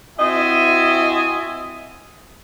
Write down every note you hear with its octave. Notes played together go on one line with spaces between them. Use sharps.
C4 E4 F#4 D#5 E5 G#5